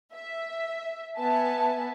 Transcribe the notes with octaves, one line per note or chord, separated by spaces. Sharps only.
E5
B3 E5 G#5 A5